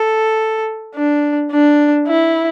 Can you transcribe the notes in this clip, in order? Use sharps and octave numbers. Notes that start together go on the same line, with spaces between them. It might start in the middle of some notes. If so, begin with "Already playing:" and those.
Already playing: A4
D4
D4
E4